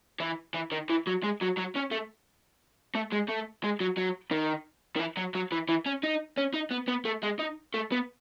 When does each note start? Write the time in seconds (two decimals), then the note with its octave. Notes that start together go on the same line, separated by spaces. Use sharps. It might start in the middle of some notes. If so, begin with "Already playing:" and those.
0.20 E3
0.54 E3
0.72 D#3
0.90 E3
1.07 F#3
1.23 G#3
1.41 F#3
1.57 F#3
1.75 C#4
1.91 A3
2.95 A3
3.12 G#3
3.28 A3
3.64 G#3
3.80 F#3
3.98 F#3
4.31 D#3
4.96 D#3
5.00 E3
5.17 F#3
5.35 F#3
5.52 E3
5.69 E3
5.86 C#4
6.03 D#4
6.37 C#4
6.54 D#4
6.71 B3
6.88 B3
7.05 A3
7.23 G#3
7.39 D#4
7.74 A3
7.92 B3